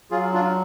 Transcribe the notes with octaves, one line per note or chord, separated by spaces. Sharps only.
F#3 F4 G#4
D4 F4